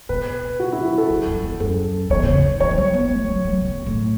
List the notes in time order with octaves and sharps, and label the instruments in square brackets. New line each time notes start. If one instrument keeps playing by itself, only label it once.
[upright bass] B2 [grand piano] B4
[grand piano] F#4
E4
F#4
A4
[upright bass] F#2
F#2
E2
[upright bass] F#2 [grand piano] A4
[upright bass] E2 [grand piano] C#5
[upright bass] B2
C#3
E3
[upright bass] E3 [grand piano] C#5
[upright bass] E3
F#3
B3
A3
F#3
F#3
B2
F#2
A2